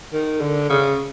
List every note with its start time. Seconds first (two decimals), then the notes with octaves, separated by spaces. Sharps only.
0.13 D#3
0.41 D3
0.69 C#3